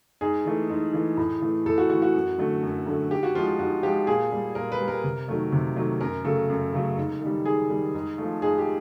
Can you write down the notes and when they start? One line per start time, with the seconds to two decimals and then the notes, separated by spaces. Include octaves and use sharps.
0.21 G#2 G#4
0.45 E3 A3
0.69 G#2
0.93 E3 A3
1.17 A2
1.41 E3 A3
1.66 A2 A4
1.78 F#4
1.90 E3 A3 F#4
2.02 F#4
2.14 F#2
2.38 D3 F#3 A3
2.63 F#2
2.87 D3 F#3 A3
3.11 G#2 G4
3.23 F#4
3.35 F3 G#3 F4
3.46 F4
3.59 G#2 F#4
3.83 F3 G#3 G4
4.07 A#2 G#4
4.32 G3
4.55 A#2 A#4
4.72 B4
4.80 G3
4.88 A#4
5.04 C3
5.28 D#3 F#3 A3
5.52 C3
5.76 D#3 F#3 A3
6.01 F#2 A#4
6.24 C#3 F#3 A3 A4
6.49 F#2
6.73 C#3 F#3 A3
6.97 G#2
7.21 D#3 G3
7.45 G#2 G#4
7.70 D#3 G3
7.94 G#2
8.18 F3 A3
8.42 G#2 G#4
8.58 G4